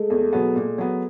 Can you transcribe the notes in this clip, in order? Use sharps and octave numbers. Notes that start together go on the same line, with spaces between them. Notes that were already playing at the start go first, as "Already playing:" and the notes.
Already playing: G#3 A3
E2 A3
B2 F#3 B3
A#2
F#3 B3